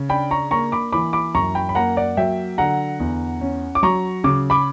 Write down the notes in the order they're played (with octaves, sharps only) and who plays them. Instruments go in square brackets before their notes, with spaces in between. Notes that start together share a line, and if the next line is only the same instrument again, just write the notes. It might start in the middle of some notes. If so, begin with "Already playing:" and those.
Already playing: [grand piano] C#3
D4 G5 B5
A#5 C#6
A#3 A#5 C#6
B5 D6
E3 B5 D6
B5 D6
F#2 A#5 C#6
G5 B5
B5
A#3 F#5 A#5
D5 F#5
F#3 E5 G5
D3 F#5 A#5
E2
C#4
D6
F#3 A#5 C#6
C#3 D6
B5 D6